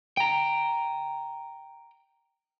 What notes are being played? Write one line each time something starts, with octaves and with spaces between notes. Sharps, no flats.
G5 A#5